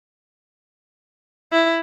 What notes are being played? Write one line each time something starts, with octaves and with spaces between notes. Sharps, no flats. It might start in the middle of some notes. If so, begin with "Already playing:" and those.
E4